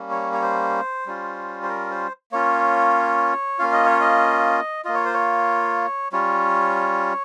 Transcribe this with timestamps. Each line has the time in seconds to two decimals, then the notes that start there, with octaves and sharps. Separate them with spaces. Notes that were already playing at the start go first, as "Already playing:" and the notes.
Already playing: G3 A#3 C#4
0.10 C#5
0.33 C#5
0.42 C5
1.06 G3 C#4 F4
1.63 C5
1.69 A#4
1.91 C5
2.32 A#3 C#4 F4 C#5
3.59 A#3 C#4 F4 F5
3.73 D#5
3.86 C#5
4.01 D#5
4.85 A#3 F4 D#5
4.95 C#5
5.05 C5
5.14 C#5
6.12 G3 C#4 F4 C#5